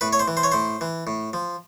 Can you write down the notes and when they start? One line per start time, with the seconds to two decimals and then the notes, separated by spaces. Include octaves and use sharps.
0.01 A2 B4
0.13 C#5
0.19 C5
0.28 E3
0.37 C5
0.43 C#5
0.52 A2 C5
0.81 E3
1.07 A2
1.33 F3